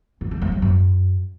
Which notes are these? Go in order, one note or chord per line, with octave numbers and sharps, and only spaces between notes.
F#2
F2
G3
F#3
F#2